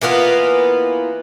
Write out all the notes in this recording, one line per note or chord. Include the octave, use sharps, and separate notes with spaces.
E3 A#3 B3 F4